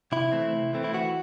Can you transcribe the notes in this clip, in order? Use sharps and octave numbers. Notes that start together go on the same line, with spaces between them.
C3 E4
E3 A3 C4
C3
E3 A3 C4
E4
E3 F#4